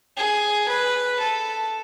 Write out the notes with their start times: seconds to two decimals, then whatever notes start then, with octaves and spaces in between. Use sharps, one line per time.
0.17 G#4
0.68 B4
1.20 A4